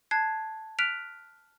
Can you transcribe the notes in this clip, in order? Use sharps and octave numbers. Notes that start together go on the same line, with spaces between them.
A5 F#6 G#6 C7
F6 F#6 B6 D7 F7